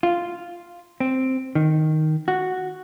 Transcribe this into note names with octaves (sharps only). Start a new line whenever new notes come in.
F4
C4
D#3
F#4